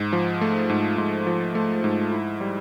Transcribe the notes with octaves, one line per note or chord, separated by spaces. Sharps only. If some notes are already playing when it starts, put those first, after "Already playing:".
Already playing: G#2
F3
A3
G#2
G#2
F3
A3
G#2
E4
G3